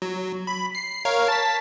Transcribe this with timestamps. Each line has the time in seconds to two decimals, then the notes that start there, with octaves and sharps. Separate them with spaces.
0.02 F#3
0.47 B5
0.75 C7
1.05 A#4 C#5 F5
1.28 A5 A6 B6